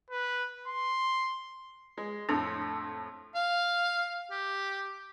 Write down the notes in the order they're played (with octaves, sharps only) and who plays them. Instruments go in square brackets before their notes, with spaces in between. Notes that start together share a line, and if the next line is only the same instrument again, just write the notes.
[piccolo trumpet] B4
C6
[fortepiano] G#3
[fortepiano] F2 A2 [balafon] D4
[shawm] F5
G4